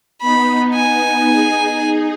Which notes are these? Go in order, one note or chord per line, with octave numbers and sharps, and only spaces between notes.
B3 D#4 B5
G#5
D#4 G#4